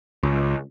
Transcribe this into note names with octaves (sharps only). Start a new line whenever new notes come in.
C#2